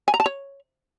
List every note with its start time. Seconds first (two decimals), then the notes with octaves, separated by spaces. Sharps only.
0.08 G#5
0.14 A#5
0.20 A5
0.26 C#5